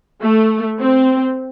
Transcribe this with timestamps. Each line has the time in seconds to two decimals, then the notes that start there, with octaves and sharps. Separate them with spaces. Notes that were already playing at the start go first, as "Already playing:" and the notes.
0.21 A3
0.80 C4